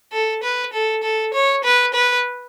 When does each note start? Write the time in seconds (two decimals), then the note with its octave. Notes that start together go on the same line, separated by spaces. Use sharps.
0.12 A4
0.43 B4
0.73 A4
1.03 A4
1.33 C#5
1.64 B4
1.94 B4